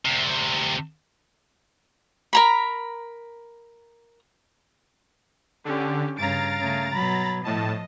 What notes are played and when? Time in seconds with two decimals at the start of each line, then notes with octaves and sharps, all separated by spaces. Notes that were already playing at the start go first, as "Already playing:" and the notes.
0.05 D2 C3
2.33 A#4 A#5 B5
5.65 D3 C#4 G4
6.18 G2 C#3 F5 A#5 A6 D7
6.60 C#3 A3
6.94 B2 F#3 B5
7.44 A2 F3 D#5 A5